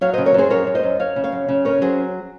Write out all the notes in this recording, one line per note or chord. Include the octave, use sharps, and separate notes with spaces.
F#3 C#5 F5
C#3 C5 D#5
A#4 C#5
F#2 G#4 C5
F#2 A#4 C#5
F#2
C5 D#5
F#2
F#2 C#5 F5
C#3
C#5 F5
F#2
C#3
C#4 A#4 C#5
F#3 G#4 C5